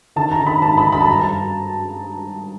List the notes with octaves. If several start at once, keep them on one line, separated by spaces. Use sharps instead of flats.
D#3 A5
A#5
D#3
B5
G#2 A5
B5
D#3
B5
A5
G2 A#5
A5